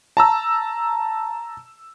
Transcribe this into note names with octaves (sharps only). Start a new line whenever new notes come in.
A5 A#5 E6